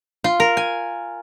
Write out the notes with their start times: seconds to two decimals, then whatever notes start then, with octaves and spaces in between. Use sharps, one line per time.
0.24 F4
0.40 A#4
0.57 G#5